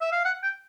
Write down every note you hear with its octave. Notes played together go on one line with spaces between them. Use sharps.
E5
F5
F#5
G5